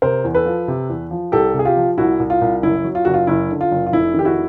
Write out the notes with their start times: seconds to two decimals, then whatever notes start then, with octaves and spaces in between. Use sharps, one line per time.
0.02 C3 A#4 C5
0.24 E2
0.35 A4 B4
0.46 F3
0.68 C3
0.89 E2
1.10 F3
1.32 C2 G4 A4
1.54 C3 G#4
1.65 F4 G4
1.76 F3
1.98 C2 E4 F#4
2.20 C2
2.30 F4
2.41 C2
2.62 F#1 E4
2.84 F#3
2.95 F4
3.05 F#1 F#4
3.14 F4
3.27 F#1 E4
3.49 D3
3.61 F4
3.71 F#1
3.86 F4
3.92 F1 E4
4.14 D#3 G4
4.25 E4 F#4